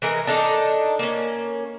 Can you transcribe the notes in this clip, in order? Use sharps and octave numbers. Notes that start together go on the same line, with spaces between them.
E3 G#3 A#4
D4 D#4 A4
A#3 C#4